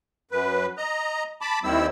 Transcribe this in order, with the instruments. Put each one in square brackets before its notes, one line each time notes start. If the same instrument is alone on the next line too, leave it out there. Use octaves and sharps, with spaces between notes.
[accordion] F#2 B4
D#5 A#5
A5 B5 D6
D#2 D#3 G3 C4 E4 E6